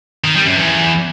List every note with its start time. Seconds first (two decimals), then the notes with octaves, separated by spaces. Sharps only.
0.25 D#3
0.36 G3
0.47 F#2
0.58 E2